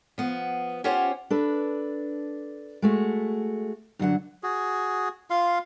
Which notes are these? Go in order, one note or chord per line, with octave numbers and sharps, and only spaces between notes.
F3 B3
C#4 F4 G4 C5 C#5 F#5
D4 A4 B4
G#3 A3 F#4
F#2 D3 F#3 F#5
F#4 G#4
F4 F5 C6